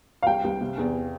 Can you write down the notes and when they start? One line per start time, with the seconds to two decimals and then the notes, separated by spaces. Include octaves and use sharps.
0.23 F5
0.27 C2 G5
0.44 C2
0.61 C3
0.78 E2